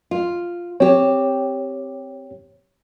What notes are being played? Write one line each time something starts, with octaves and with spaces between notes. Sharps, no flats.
F4
C4 G4 C#5